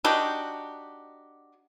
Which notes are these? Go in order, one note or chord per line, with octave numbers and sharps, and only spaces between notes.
D4 D#4 F#4 G4